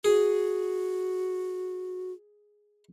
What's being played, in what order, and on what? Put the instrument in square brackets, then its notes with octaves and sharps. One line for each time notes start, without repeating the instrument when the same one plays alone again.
[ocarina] F#4 [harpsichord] G#4